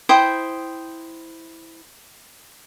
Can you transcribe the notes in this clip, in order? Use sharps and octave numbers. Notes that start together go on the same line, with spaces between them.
E4 C5 G5 D#6